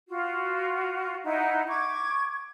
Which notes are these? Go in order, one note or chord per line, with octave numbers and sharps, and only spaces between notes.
F4 F#4
D#4 E4 E5 F#5
C#6 D6 G#6